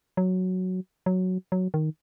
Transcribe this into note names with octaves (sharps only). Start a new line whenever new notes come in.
F#3
F#3
F#3
D#3